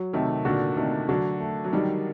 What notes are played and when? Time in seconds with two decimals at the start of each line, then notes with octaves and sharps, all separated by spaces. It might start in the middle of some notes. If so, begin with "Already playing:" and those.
Already playing: F#3
0.13 C3 D#3 A3
0.45 A#2 D3 F#4
0.77 C3 D#3 A3
1.09 D3 F#3 F#4
1.40 A3
1.64 F#3
1.73 D#3 G3 D#4